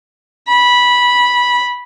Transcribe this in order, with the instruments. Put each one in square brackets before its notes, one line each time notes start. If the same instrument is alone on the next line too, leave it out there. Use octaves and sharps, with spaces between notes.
[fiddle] B5